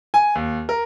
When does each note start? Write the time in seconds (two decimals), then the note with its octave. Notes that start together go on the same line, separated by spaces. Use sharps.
0.14 G#5
0.35 D#2
0.69 A#4